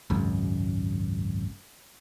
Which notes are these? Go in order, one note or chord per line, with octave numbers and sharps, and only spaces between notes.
G#1 C#2 F#2